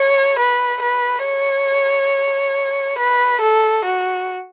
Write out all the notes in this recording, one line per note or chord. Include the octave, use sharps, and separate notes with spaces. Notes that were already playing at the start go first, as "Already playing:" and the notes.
Already playing: C#5
B4
B4
C#5
B4
A4
F#4